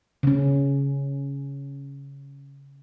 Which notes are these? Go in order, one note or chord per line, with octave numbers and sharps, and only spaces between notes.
C#3 C#4